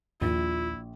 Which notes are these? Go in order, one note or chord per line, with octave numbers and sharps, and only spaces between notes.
A#1 D#2 E4 F4